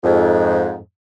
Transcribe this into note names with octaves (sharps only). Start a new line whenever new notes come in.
F2 G#2